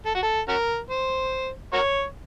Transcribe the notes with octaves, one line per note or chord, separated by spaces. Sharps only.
A4
F#4
A4
C#4 F#4 A#4
C5
F#4 A#4 C#5